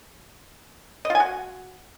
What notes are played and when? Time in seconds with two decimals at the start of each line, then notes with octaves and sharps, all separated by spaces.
1.05 D#5
1.10 F4
1.15 G#5
1.20 F#4